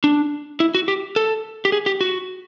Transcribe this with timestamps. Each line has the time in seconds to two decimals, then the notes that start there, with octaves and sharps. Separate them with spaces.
0.04 D4
0.60 E4
0.75 F#4
0.88 G4
1.16 A4
1.65 G4
1.72 G#4
1.86 G4
2.01 F#4